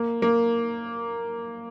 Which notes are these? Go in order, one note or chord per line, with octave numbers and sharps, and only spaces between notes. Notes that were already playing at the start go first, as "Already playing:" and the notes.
Already playing: A#3
A#3